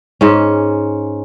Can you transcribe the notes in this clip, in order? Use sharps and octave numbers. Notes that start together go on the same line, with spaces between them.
G#2 C#4